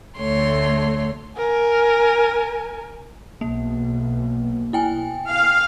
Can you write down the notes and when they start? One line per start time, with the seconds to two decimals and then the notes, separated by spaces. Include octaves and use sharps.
0.18 D2 A3 C#5 C6
1.37 A#4 G#5
3.41 B1 A#3
4.73 E4 G5 G#5
5.29 F5